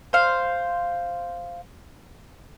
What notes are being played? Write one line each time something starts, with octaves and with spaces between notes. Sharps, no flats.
C5 F5